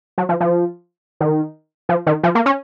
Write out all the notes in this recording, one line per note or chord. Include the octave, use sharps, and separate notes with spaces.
F#3
F3
F3
D#3
F3
D#3
F3
A#3
C#4